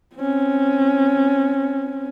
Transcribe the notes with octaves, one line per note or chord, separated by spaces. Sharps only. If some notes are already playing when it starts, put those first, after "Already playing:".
C4 C#4